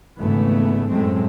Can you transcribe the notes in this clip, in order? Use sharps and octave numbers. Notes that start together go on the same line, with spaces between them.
G#1 C#3 E3 A3 B3
F#2 A2 F#3 G#3 A3 C4